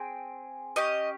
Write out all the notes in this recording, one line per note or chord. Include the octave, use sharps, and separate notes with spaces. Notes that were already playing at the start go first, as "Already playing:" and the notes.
Already playing: C4 G#4 G5
C#4 G4 D#5